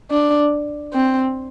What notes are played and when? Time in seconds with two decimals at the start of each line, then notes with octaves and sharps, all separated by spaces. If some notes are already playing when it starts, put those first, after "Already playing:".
0.11 D4
0.93 C4